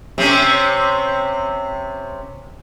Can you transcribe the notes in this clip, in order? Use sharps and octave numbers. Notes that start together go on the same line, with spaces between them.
C3 C4 C#4